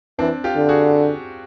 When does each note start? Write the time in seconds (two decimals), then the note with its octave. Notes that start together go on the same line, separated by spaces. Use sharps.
0.19 E3 C4 D4
0.44 F4 G4
0.56 D3
0.69 F#4 G#4